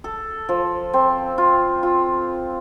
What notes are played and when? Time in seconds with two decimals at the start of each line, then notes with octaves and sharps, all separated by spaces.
0.04 A4
0.49 F3
0.93 C4
1.38 F4
1.83 F4